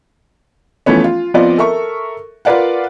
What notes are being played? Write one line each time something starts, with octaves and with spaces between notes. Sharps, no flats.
E3 F3 A3 B3 C#4
F4
F3 B3 C4 F4 D5 D#5
A4 A#4 E5 C#6
F4 A#4 B4 D5 F5 F#5